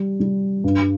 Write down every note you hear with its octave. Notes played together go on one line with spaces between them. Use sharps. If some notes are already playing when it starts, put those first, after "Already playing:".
Already playing: G3
G3
G2